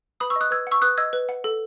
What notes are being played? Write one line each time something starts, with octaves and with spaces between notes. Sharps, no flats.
B4 B5 D#6
C#6 E6
D#5 D#6 F#6
B4 E6 G#6
F#5 C#6 E6
B4 D#6 F#6
D#5 E6 G#6
B4
F#5
A4